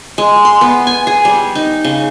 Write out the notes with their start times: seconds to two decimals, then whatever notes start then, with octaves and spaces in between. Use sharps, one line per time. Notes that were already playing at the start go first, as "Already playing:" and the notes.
0.18 G#3
0.45 C6
0.61 B3
0.87 G#5
1.07 G#4
1.25 G3
1.55 D#4
1.85 C#3